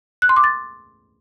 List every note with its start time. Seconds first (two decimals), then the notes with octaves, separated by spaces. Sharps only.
0.22 F#6
0.29 C6
0.37 D6
0.44 A6